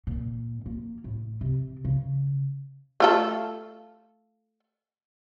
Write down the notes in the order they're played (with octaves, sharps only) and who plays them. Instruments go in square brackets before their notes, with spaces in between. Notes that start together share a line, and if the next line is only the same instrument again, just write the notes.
[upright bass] A#2
A#3
A2
C3
C#3
[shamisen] A3 F4 A4